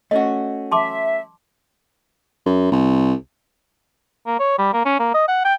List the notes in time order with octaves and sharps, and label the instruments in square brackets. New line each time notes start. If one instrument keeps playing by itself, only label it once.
[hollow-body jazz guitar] A3 C#4 F#4 [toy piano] D#5
[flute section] E5 [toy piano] A5 C6 D6
[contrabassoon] F#2
C2
[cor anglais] A#3
C#5
G3
A#3
C#4
A#3
D#5
F#5
G5